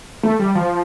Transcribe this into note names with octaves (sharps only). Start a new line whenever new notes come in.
A3
G3
F3